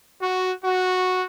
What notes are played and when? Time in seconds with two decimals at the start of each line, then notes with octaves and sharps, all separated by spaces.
0.21 F#4
0.64 F#4